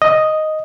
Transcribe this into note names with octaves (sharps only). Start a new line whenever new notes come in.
D#5